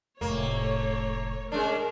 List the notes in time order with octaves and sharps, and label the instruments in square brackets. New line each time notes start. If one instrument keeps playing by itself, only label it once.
[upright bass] F1 A2 [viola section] A3 C#5 [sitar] A#3
[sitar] G#3 C#4 D4 [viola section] A#4